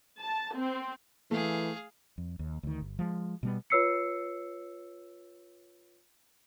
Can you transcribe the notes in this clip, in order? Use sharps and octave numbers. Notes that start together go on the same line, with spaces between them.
A5
C4
E3 A3 G#4 F5
F2
D#2
D2 D#3
G1
F3 G#3
B2 G3 B3
F4 B4 C#5 E6 C7 C#7